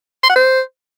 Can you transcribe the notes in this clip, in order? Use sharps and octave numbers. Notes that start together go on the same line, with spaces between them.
C6
F#5
C5